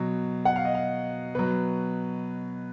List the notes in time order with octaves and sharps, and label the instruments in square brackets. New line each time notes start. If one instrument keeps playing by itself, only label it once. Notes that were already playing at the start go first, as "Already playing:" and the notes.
Already playing: [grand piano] B2 F#3
F#5
F5
D#5
F5
B2 F#3 B4